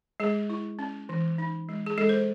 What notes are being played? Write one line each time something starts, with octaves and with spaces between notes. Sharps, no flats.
G#3 G#4
E4
C#4
E3
D#4
G#3
G#4
G#3 A4
C5